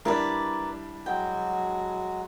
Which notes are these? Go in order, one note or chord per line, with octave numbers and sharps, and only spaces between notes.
G3 D4 E4 A#4 B4 D5
F#3 G#3 F#4 G5